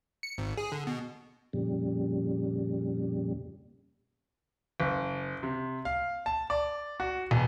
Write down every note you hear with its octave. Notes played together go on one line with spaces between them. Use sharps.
C#7
G#1
G#4
D3
B2
F2 A#2 C#3 G3
F#1
C3
F5
A5
D5
F#4
E1